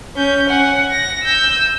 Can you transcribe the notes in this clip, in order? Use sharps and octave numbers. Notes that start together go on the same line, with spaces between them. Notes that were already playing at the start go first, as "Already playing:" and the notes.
C#4 G6
F#5 G#5
A#6
E6 G6